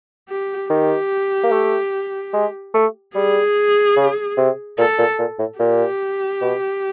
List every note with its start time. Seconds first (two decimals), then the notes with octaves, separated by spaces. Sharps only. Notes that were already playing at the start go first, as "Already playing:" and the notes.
0.29 G4
0.70 D#3 G4
1.43 A#3
1.52 A3
2.33 G#3
2.74 A3
3.15 G3 G#4
3.96 C#3
4.37 C3
4.78 A#2 A4
4.99 A#2
5.19 A#2
5.39 A2
5.59 A#2 G4
6.41 B2